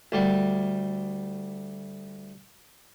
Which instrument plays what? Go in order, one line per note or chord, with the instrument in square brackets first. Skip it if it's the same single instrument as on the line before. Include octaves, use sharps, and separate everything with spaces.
[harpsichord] D2 G3